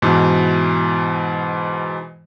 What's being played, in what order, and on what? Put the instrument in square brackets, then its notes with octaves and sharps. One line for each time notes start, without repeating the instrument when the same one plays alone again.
[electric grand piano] G#2 B2 E3